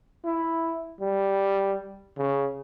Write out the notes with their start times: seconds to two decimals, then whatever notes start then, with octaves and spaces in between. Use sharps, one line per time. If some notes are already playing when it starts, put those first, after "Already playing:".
0.25 E4
1.01 G3
2.18 C#3